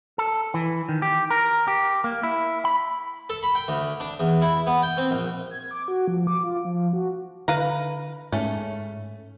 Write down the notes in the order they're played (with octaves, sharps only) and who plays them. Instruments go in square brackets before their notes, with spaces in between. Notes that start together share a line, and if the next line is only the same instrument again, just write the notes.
[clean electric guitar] A4
E3
D#3
G4
A#4
G4
A#3
E4
B5
[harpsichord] A4
B5
G5
D2
D4
E2
E4
B3
G5
C4
A#1
[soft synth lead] G#6
D6
F#4
F3
D6
F4
F3
F#4
[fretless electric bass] D3 [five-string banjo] B4 F5 A#5
[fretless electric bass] G#2 [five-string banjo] A3 C#4